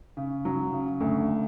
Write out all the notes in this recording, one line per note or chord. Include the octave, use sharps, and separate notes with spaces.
C#3
F#3
C#3
D2